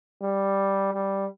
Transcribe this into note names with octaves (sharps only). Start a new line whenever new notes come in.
G3
G3